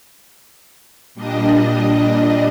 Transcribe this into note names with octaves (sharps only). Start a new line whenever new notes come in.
A#2 G3 D4 D#5